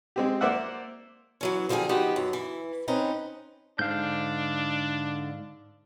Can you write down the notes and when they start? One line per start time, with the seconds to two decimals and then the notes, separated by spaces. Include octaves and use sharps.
0.16 G#3 C4 G4
0.41 A#3 C5 D5 E5 F#5
1.41 E3 F#3 C#4
1.69 D3 F3 G3 A#3 G#4
1.89 F3 B3 D#4 F#4 G4
2.16 F#2
2.33 E3
2.88 C4 C#4 D#4 B4
3.79 G#2 D3 D4 F5 G6